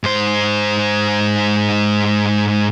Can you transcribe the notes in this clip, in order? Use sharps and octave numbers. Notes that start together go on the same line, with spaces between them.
G#2 C5